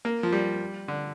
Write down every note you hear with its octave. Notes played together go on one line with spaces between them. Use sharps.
A#3
F3
G3
D3